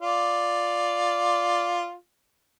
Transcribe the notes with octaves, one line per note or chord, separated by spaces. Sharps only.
F4 D5